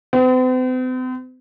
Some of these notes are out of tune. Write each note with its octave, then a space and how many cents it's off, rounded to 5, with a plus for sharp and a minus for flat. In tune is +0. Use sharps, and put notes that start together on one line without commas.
C4 -45